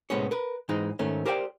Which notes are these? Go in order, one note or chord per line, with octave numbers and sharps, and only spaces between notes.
C2 A2 G#3 B3 C#4 C#5
A#4 B4
G#2 E3 G#3 D#4
G#2 D#3 A3 C#4
G4 A#4 C5 D5 F#5 G5